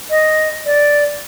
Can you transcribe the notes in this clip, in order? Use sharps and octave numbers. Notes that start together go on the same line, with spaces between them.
D#5
D5